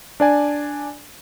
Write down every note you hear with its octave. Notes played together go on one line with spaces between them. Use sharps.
D4 D5 G#5